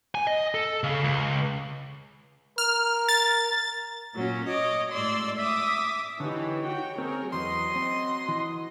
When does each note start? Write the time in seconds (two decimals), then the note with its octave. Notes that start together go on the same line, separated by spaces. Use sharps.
0.15 G#5
0.27 D#5
0.55 A4
0.83 C#3
1.03 C#2
2.58 A#4 F6
3.09 A6
4.14 A#2 F#3 C#4
4.46 C#5 D#5 D6
4.91 A2 G#3 D5 C6 E6
5.39 E5 D6 D#6
6.20 D3 E3 D#4 G4 C#5
6.66 F#4 G5
6.98 C4 G#4 A#4
7.33 E2 F#3 D#5 C6
7.76 C4
8.29 E3